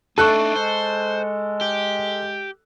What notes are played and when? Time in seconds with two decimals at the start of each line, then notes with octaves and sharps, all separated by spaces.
0.18 A3 D4 D#4 A4 A5 C#6 F#6
0.55 G#3 C5
1.61 G4